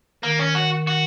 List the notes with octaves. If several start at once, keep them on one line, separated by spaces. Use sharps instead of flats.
D#3 A#3
C#4
F#4
F#4